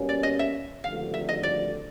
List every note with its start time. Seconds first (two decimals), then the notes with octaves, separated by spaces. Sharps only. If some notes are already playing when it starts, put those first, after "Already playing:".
Already playing: B2 G3 A#3 C#4
0.09 D5
0.23 D#5
0.39 E5
0.84 G#1 G2 D3 F3 A3 F5
1.14 E5
1.29 D#5
1.43 D5